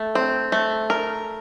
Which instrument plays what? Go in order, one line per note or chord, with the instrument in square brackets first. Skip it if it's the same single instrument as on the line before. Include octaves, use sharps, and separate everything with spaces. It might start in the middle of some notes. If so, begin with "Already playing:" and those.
Already playing: [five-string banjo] A3
C4
A3
A#4